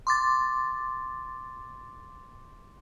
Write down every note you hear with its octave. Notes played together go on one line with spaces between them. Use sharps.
C6 D6 A6